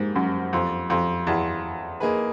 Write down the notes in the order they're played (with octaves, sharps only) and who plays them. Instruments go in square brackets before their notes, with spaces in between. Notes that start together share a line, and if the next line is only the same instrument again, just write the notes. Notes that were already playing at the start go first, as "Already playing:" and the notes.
Already playing: [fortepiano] G#2 [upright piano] G3 A#3
[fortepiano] F#2
F2
F2
E2
[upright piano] A#3 D#4 G#4 B4